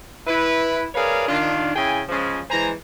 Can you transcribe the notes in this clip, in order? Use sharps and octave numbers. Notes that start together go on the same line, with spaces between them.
E4 B4
G#4 A#4 B4 C#5 D5 F5
D#3 D4 F4
C#3 E4 G#4 G5 G#5
C#3 F3 G#3
E3 G#3 C5 G#5 A#5